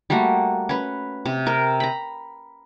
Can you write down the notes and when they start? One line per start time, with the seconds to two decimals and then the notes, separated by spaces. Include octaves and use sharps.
0.10 G3 A3 A#3 F#4
0.69 C#4 B4
1.25 C3
1.46 C4 A#4
1.80 A#5 B5